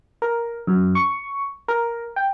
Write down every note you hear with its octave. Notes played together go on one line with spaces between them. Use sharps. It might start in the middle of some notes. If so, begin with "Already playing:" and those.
A#4
F#2
C#6
A#4
G5